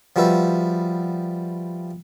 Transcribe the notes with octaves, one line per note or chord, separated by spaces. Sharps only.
F3 G3 F#4 B4 E5